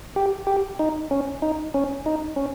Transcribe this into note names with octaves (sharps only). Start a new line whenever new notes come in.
G4
G4
D#4
C#4
D#4
C#4
D#4
C#4